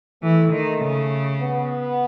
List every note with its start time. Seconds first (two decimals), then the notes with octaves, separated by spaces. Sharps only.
0.23 E3 A3
0.52 D#3
0.81 C#3
1.39 B3